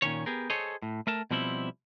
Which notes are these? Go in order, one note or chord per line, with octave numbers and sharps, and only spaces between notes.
A#2 D#3 C#4 C#5
B3 G4 G#4 A#4
G#4 A4 C5 C#5 D#5
A2
A3 A#4 A5
B2 F3 G3 C4 E4